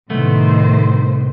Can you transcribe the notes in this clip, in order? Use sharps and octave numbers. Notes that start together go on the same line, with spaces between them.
C2 A2 D#3 A3 B3 C5